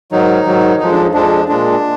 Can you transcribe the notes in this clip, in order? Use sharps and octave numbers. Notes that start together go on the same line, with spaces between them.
G#2 D#3 F#3 D#4
G#2 D#3 F#3
F2 F3 G#3 D#4
D4
F2 F3 G#3 D4
A#2 G#3 D4